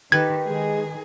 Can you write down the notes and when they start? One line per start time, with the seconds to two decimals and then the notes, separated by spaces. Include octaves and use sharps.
0.12 D#3 G4 A4 B4 G#6
0.46 D#3 G#3 G#4